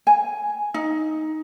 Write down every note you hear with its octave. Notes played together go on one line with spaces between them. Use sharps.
G#5
D#4